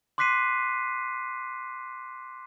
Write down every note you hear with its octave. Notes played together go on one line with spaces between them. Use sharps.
C6 D6 F#6 B6 C7 D#7